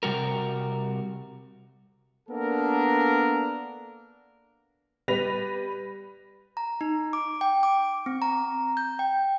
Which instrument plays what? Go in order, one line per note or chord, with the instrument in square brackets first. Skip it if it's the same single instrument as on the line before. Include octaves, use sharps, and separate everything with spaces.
[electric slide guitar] C3 G3 F#4 A#4
[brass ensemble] A#3 B3 D4 A4 A#4
[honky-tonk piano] G3 B4 B5 A#6 B6 F7
[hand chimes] A#5
D#4
D6
G5
D6
C4
A#5
G6
G5